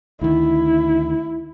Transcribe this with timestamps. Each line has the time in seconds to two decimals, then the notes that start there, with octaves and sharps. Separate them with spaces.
0.21 D2 D#3 E4